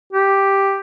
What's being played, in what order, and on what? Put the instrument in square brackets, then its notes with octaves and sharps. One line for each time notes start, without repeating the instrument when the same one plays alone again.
[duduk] G4